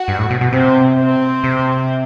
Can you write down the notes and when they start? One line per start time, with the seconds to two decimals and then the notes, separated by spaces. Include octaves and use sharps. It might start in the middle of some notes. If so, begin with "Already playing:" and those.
Already playing: F#4
0.08 G2
0.19 A2
0.31 B2
0.41 B2
0.52 C3 C4
0.99 C4
1.44 C3